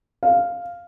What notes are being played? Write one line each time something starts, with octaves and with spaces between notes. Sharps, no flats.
F5